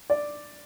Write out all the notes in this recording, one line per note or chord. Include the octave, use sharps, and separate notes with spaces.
D5